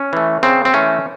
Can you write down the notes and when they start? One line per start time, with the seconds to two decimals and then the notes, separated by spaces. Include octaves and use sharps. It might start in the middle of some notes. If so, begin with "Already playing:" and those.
Already playing: C#4
0.13 E3 A3
0.43 C#3 C4
0.65 C4
0.74 E3 A3 C#4